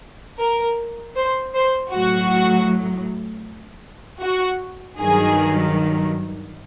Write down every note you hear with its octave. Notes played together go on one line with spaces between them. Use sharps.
A#4
C5
C5
A2 F#3 F#4
F#4
G2 D#3 F#3 G#4